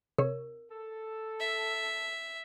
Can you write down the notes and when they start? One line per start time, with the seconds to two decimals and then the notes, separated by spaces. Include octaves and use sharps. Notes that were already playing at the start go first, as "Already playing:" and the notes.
0.18 C3 A#4 C#5
0.71 A4
1.40 E5